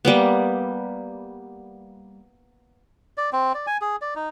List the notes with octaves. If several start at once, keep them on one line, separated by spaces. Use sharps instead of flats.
G3 A#3 B3
D5
C4
D5
G#5
G#4
D5
D#4